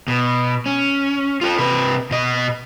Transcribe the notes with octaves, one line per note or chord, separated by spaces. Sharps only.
B2
C#4
F4 A4
C3 B4
B2 D#5